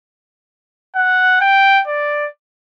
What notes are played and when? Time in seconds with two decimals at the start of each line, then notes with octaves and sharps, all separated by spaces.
0.96 F#5
1.41 G5
1.87 D5